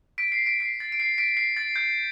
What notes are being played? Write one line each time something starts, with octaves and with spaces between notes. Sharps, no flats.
B6 D7
C7
B6 D7
C7
A6
D7
C7
B6 D7
C7
A6
G6